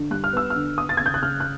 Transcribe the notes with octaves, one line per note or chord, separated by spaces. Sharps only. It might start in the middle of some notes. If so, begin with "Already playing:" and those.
Already playing: D3
G3 F#6
F6
B3 E6
D3 F6
B3 D#6
A6
C#3 G#6
G6
F#6
C#3 F6
F#6